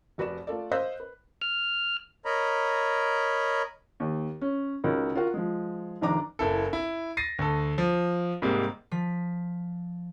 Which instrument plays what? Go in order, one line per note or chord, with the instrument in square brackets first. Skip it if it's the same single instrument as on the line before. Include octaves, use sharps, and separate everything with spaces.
[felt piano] F1 F#4 B4 D5 E7
A3 F4 A4 D5
C5 D#5 F5 E6 F#6 B6
B4
[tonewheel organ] F6
[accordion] A#4 C#5 D#5 A#5 B5
[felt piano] D#2
C#4
C#2 F#3 D#4 F#4 A#4
F4 F#4 A#4 F#5
F3 G#3
F1 D#3 D4 A#5 D6
[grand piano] F#1 E4 A4
E4
A6 A#6 C7 D#7
D2 A4
F3
G#2 C3 G3 G#3 A#3
[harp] F3 B6